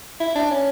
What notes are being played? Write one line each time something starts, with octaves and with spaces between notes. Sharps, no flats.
E4
D4
C#4